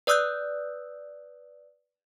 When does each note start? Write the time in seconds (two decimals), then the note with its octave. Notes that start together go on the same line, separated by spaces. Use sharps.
0.07 B4 D5 D#6 E6 F#6 G6